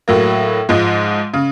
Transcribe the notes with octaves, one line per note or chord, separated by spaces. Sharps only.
A2 F#3 A#3
G#2 F3 G#3
C#3